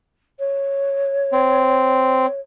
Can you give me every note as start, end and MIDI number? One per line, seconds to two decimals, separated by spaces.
0.39 2.40 73
1.33 2.26 60